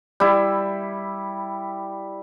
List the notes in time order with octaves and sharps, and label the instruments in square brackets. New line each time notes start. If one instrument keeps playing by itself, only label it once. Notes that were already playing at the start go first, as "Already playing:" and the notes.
[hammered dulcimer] G3 E4